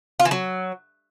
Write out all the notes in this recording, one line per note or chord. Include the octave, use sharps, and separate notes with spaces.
F4
E3
F#3